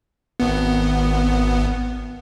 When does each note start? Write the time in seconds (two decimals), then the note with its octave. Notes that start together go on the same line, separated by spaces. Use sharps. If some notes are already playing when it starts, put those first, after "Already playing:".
0.40 G#1 B3